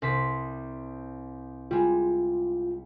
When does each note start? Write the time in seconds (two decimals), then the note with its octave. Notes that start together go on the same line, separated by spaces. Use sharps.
0.02 C2 C5 B6
1.71 G3 G#3 F4